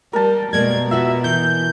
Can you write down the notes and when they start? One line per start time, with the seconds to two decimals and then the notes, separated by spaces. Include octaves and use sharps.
0.13 G3 A#4 A5
0.53 B2 G3 G#3 A#3 G#6
0.91 F4 F#4 B4 E5
1.24 E3 G6